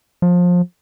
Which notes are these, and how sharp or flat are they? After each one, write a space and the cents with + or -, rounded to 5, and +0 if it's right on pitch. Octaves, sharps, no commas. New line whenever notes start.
F3 +25